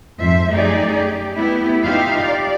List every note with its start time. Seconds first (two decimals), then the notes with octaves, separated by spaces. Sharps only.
0.18 F2 G#2 F3 C5 E5
0.51 F#2 A3 D#4 G4 G#4 D5
0.93 G4
1.35 A3 B3 E4 G4
1.83 D#4 F4 G4 E5 F5
2.24 D5